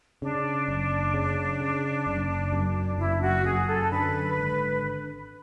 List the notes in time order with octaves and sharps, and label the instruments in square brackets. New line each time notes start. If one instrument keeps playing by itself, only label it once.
[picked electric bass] C#3 [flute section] D4
[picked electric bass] F#1
C#3
C#3
F#1
F#2
[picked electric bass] F#1 [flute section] E4
[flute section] F#4
[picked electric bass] F#2 [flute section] G#4
[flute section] A4
[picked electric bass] D3 [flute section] B4
[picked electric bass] G#1